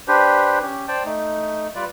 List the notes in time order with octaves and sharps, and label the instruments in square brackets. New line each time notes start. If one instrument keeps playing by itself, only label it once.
[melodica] D4 G4 B4 C5
C#4 G4
C5 D5 G5 A5
A3 D#4
G3 F4 B4 D5